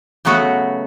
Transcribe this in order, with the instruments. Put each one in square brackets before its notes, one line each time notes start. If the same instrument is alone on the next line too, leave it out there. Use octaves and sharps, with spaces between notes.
[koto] C#3 F#3 A3 B3 F#4